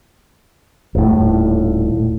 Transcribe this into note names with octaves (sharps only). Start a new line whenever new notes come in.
D#1 A2